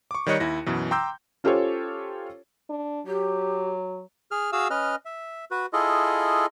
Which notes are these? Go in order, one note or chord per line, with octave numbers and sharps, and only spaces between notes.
C#6 D6
D#3 G3 C#5 D#5 F#6 C#7
D#2 E4 A#6
F#2 B2 E3
G5 A#5 C6 D6 E6 G6
C#4 F4 G4 A4 C5 C#5
D4
F#3 G4
G#4 F6
F#4 G#4 F5 E6
C#4 B4 D#5 F6
E5
F#4 B4
E4 F4 G#4 A4 D#5